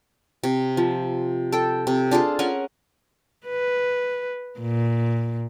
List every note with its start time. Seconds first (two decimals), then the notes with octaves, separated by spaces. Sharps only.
0.43 C3
0.77 F3
1.52 A4 G5
1.87 C3
2.11 D4 F4 G#4 A4
2.39 C#4 A#4 F#5 G#5
3.47 B4
4.60 A#2